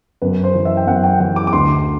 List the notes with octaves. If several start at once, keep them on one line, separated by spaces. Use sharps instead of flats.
F#2 B4
C5
E3
E5
G5
F#2 F#5
G5
E3 G5
D6
D6
D2 C6